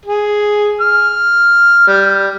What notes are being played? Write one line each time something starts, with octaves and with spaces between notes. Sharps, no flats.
G#4
F6
G3